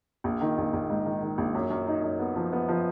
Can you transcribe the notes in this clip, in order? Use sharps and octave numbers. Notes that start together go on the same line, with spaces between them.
A#1
D#3
A#1
A#1
G#2
D#3
D#3
A#1
F#2
F#2
D#4
F#2
B3
F3
B3
F3